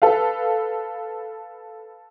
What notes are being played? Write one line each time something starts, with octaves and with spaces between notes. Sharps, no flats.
A4 B4 F5